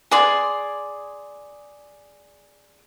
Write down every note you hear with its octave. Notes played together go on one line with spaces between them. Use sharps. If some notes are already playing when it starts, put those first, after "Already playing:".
G#4 D5 C6